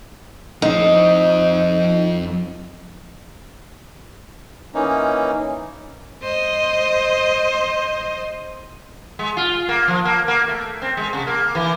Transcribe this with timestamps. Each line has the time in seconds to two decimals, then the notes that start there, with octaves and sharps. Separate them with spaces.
0.62 F2 D#4 C5
4.75 E3 A#3 C#4 D#4
6.23 C5 D#5
9.19 G#3
9.37 F4
9.69 A#3
9.88 F3
10.05 A#3
10.28 A#3
10.48 A3
10.82 C4
10.97 G#3
11.13 C3
11.27 A#3
11.55 E3